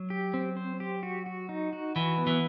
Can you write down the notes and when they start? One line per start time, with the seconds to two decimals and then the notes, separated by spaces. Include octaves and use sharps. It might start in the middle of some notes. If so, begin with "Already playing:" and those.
Already playing: F#3
0.10 G4
0.34 C4
0.57 C5
0.80 G4
1.03 F#4
1.26 F#4
1.49 D#4
1.73 F#4
1.96 E3 F#4
2.18 B3
2.27 E3